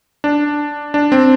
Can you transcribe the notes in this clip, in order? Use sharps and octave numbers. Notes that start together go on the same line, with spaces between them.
D4
D4
C4